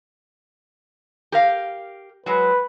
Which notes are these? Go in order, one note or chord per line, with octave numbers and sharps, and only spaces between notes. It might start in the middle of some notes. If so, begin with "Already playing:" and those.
G4 A#4 F5
F#3 G#3 B4